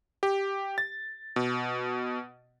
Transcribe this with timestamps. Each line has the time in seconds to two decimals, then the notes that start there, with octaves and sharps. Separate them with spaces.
0.23 G4
0.78 A6
1.36 B2